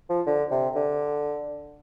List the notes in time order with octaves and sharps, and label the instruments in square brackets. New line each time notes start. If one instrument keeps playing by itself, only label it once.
[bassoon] F3
D3
C3
D3